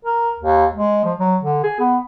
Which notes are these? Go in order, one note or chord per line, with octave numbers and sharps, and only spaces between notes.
A#4
D#2
G#3
F3
F#3
D3
G#4
B3